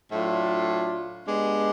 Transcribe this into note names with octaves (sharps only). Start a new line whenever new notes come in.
A2 F#3 A3 D4 F4
G#3 B3 D4 G4